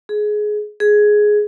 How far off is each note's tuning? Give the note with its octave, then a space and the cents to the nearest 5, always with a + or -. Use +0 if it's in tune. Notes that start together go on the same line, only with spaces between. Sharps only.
G#4 +15
G#4 +10